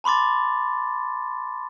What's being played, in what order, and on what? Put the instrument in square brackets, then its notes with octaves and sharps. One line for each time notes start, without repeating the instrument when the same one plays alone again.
[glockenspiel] A5 B5 C6 D6 A6